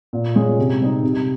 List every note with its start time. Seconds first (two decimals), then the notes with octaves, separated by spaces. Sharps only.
0.13 A#2
0.36 G#3 C#4 F4
0.59 C3
0.80 G3 C4 D#4
1.03 C3